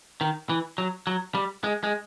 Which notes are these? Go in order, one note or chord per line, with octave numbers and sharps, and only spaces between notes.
D#3
E3
F#3
F#3
G3
G#3
G#3